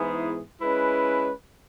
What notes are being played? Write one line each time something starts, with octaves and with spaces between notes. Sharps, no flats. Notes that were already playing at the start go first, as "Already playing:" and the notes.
Already playing: G#2 E3 B3 E4 G#4
G#3 C#4 E4 B4